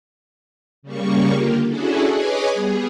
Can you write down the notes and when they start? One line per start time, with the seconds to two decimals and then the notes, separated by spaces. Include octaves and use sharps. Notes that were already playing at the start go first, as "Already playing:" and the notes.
0.83 C#3 G3 A#3 C#6
1.33 D3 A#3 F4 G4
1.66 C#4 D4 E4 F#4 G#4 A4
2.07 G#4 B4 C#5 D#5 G#5 D6
2.54 G3 B3 G#4